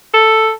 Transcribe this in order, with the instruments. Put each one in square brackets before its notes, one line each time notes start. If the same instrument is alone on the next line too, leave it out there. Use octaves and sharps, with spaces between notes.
[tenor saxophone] A4